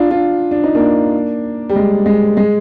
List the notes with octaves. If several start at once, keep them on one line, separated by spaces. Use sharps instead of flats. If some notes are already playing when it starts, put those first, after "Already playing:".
Already playing: D4 F4
D4 F4
D4
D#4
A#3 D4
G3
G#3
G#3
G#3